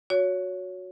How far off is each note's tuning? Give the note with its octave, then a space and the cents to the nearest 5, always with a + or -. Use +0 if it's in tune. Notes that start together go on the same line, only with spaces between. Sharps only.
F#4 -15 C#5 +15